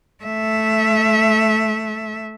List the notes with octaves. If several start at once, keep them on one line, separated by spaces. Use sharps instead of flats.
A3 E5